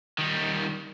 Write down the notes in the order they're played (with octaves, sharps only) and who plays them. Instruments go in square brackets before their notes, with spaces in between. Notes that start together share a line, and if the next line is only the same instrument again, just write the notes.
[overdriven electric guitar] D#3 G3